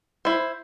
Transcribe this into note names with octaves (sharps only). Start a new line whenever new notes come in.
E4 C5